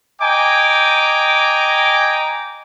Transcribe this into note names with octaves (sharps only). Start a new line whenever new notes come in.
D#5 G5 G#5 A#5 D6